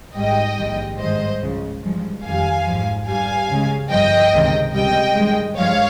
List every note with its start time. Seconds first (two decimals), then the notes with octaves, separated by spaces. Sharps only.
0.16 G#1 G#2 G3 D#5 G5
0.57 A#1 G#2 D#3 G3
0.99 G#1 G2 D#3 G#3 C5 D#5
1.41 C#2 C#3 F3
1.83 G2 F3 G#3
2.24 F2 D#3 G3 F5 G#5
2.66 G#1 G#2 F3
3.07 G2 G3 F5 G#5
3.49 C#2 C#3 G#3
3.91 G1 G2 F3 D#5 G5
4.32 C#2 C3 D#3
4.73 C#2 C3 G3 D#5 G5
5.15 G2 D#3 G#3
5.57 G2 F3 G#3 C#5 F5